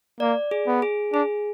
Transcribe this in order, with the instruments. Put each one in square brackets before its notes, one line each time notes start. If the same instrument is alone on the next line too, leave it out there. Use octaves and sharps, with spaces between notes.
[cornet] A#3 [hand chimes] D5
[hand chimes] G#4
[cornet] B3
[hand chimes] G#4
[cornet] D4 [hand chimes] G#4